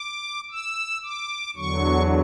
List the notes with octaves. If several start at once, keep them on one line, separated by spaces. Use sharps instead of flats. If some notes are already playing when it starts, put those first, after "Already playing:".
Already playing: D6
E6
D6
E2 D3 F#3 C#6